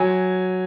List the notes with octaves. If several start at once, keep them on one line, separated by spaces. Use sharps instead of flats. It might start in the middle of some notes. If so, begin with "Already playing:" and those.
Already playing: F#3 G#5